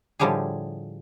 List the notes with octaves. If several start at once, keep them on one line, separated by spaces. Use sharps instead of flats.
A2 D3 F3 G3 G4 G#4